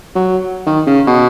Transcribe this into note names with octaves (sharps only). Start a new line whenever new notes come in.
F#3
D#3
C#3
B2